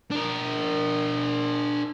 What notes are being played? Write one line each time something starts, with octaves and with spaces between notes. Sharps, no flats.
D4 A#4